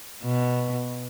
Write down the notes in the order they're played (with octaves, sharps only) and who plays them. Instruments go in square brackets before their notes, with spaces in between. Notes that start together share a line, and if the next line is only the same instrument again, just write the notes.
[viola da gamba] B2